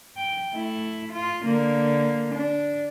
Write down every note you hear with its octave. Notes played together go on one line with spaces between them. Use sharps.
G5
A3 E4
F4
D3 A#3
D4